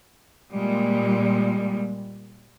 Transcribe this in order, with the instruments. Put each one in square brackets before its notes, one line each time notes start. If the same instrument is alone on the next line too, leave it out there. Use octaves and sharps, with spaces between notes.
[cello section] A#2 G3 G#3